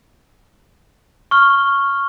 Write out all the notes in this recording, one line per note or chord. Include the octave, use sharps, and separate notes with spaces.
C#6 F6 G7